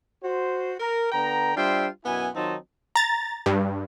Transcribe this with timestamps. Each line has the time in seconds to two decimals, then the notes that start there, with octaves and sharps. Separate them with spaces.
0.23 F#4 C5
0.79 A#4
1.12 D3 B3 G5 A#5
1.55 G3 D4 F4 C5 E5 G5
2.05 F#2 B2 B3 E4 G#5
2.34 D#3 F#3 C4 D#4 F4 A5
2.96 A#5 A6
3.46 G2